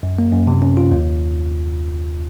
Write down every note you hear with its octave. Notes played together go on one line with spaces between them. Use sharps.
F#2
A#3
F#2
C3
C#4
F4
D#2